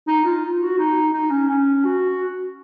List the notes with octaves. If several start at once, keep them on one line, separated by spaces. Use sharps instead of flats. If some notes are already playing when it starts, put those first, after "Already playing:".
D#4
F4
F#4
D#4
D#4
C#4
C#4
F#4